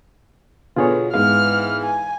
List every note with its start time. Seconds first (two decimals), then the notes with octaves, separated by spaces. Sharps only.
0.76 B2 D3 F4 G#4 B4 C#5
1.14 G#2 E3 B3 F5 F6
1.83 G#5